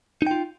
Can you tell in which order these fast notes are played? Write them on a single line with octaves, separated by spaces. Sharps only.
D#4 G5 F4